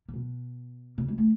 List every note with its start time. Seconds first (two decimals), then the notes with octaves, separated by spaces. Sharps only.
0.09 C#3
0.14 B2
0.98 C#3
1.08 G#3
1.18 A3